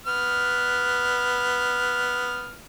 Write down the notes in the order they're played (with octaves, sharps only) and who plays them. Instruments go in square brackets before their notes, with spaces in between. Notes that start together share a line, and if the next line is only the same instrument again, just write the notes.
[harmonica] B3 F6